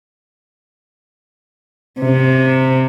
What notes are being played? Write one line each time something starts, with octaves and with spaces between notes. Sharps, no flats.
C3